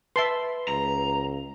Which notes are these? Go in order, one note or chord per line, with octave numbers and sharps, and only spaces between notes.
B4 E5 A5 C6
C#2 A#5